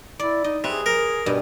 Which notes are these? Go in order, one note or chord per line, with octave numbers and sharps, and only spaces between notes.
E4 D5
D#4 D#5
C3 G#4 B4
A#4
G2 B2